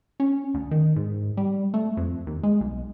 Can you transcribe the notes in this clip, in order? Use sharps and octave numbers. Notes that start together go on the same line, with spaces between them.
C#4
D2
D#3
G#2
G3
A3
F2
D#2
G#3
B1